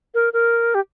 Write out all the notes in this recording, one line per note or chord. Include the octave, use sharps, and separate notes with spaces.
A#4
A#4
G4